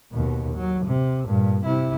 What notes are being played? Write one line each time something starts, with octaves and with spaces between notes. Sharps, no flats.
D#2 B2
F#3
C3
G2 A#2
C3 E4